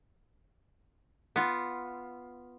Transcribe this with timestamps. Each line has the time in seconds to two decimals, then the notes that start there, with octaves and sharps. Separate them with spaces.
1.36 B3 F4